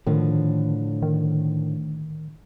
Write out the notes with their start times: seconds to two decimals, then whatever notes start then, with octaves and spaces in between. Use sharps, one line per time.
0.07 A2 D3 D#3 F3
1.02 D#3